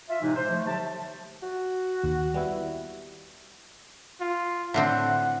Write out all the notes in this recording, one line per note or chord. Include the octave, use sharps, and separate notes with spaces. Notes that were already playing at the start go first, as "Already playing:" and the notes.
F4 E5
A2 C3 E3 G#3 D#4
C5
F3 A3
D3 F#3 G4 E5 A5
F#4
D#2
G3 B3 E4
F4
A2 D3 C4 F#5